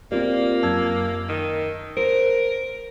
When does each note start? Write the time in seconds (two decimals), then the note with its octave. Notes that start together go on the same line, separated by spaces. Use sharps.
0.12 A#3 C4 F4 G4 D5
0.63 F#2 A5 E6 G#6
1.29 D#3
1.97 A#4 C5